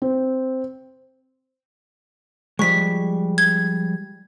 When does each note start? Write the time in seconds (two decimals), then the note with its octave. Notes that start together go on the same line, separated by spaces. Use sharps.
0.02 C4
2.59 F3 G3 G#3 C#6 B6
3.38 G#6